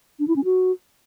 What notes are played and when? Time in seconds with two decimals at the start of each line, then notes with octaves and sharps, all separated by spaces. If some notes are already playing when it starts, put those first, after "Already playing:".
0.19 D4
0.28 E4
0.36 C#4
0.44 F#4